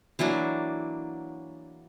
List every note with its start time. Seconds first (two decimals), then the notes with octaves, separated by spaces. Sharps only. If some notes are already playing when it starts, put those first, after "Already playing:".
0.19 E3 F#3 A#3 D4